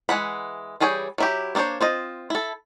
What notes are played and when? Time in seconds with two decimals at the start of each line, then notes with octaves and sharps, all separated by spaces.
0.09 E3 G#3 F#5 B5
0.80 E3 G3 G#4 C#5 G5
1.18 F#3 E4 G4
1.55 A#3 D4 A4 C5 C#5
1.81 C4 F4 D#5
2.30 E4 A4